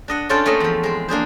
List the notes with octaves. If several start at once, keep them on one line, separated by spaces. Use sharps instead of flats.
D4 D#5 F#5
C#4 D4 F4 A4 C5 D5
A3 A#3 C4 C#5 D#5
E2 F3
G#3 C4
A#3 D4 G#4 C5